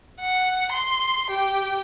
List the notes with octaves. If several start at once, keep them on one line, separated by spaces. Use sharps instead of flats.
F#5
C6
G4